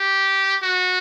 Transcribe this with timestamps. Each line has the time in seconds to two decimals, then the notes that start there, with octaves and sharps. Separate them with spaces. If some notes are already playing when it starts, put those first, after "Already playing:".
Already playing: G4
0.63 F#4